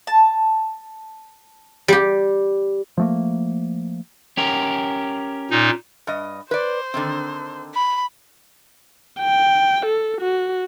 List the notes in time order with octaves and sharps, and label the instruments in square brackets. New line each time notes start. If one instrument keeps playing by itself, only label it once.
[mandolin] A5
[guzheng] G3 G4
[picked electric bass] F3 A3 A#3
[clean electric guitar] C#4 G4 A#4
[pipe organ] A#2 D#4
[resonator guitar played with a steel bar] G2 D#5
[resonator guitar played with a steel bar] B4 D5 [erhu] C5
[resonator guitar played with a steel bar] D3 D#3 C4
[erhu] B5
[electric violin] G5
A4
F#4